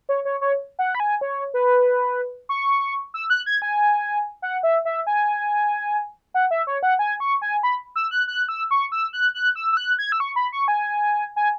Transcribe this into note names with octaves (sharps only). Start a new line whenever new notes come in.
C#5
C#5
C#5
F#5
B5
G#5
C#5
B4
C#6
E6
F#6
G#6
G#5
F#5
E5
E5
G#5
F#5
E5
C#5
F#5
G#5
C#6
G#5
B5
E6
F#6
F#6
E6
C#6
E6
F#6
F#6
E6
E6
F#6
G#6
E6
C#6
B5
C#6
G#5
G#5